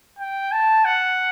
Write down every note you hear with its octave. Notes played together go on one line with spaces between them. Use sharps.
G5
A5
F#5